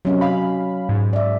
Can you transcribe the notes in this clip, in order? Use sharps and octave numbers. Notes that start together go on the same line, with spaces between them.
C3 F#3 C#4 D#5
F5 B5
G#2
D5 E5